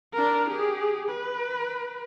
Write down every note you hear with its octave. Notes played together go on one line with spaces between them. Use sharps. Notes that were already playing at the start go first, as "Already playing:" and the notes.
D4 A#4
G4 G#4
B4